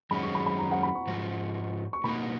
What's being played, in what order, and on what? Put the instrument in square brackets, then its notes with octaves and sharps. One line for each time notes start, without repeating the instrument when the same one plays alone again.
[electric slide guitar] F#2 D#3 G#3 C#4 F#4 [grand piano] B5
[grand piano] C#6
B5
B5
A#5
F#5
B5
C#6
[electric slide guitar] G#2 F3 F#4
[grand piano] C#6
[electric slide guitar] B2 A#3 D#4 F#4 [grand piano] B5